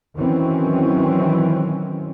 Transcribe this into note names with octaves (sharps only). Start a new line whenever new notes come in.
D#3 E3 F#3 C4 C#4